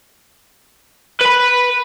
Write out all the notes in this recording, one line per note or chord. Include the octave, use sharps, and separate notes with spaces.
B4 B5